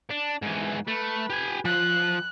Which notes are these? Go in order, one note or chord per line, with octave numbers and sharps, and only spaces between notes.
D4
G#2 E3
A3 B4
G4 G#5
F3 F#6